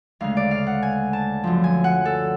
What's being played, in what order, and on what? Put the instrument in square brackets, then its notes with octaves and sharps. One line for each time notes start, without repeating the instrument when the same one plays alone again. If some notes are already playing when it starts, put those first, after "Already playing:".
[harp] D2 C#3 G#3 F5
D5
F5
F#5
G#5
A5
F#2 D3 F3
G#5
F#5
A4